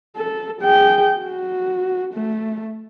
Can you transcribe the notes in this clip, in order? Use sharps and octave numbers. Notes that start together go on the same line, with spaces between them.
A4
G#4 G5
F#4
A3